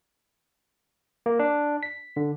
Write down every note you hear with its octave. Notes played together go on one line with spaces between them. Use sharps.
A#3
D4
B6
D3